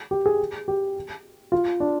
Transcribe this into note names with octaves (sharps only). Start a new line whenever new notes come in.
G4
G#4
G4
F4
D4